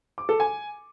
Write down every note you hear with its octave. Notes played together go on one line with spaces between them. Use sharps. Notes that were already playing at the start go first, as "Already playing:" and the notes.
D6
A4
G#5